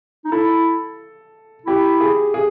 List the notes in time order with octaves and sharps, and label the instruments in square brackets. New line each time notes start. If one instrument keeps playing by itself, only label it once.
[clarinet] D#4
[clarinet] E4 [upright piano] A4
[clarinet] E4 [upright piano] G4
[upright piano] G#4
G#4